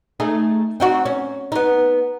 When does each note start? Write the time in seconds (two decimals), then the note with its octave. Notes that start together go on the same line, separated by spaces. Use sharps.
0.20 A3 D#4 G#4
0.80 C4 D#4 F#4
1.05 C#4
1.52 B3 D#4